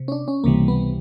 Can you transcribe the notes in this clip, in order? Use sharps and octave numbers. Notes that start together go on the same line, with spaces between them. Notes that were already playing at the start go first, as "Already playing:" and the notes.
Already playing: C3
C#4
D4
C#4
C#2 C3 E3 G3 A#3
B3